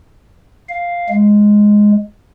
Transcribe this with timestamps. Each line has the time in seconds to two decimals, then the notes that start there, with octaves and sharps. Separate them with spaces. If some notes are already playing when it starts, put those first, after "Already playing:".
0.69 F5
1.09 G#3